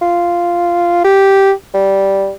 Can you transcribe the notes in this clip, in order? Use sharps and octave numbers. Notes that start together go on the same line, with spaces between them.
F4
G4
G3